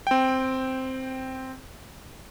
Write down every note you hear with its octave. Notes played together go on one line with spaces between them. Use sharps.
C4 G5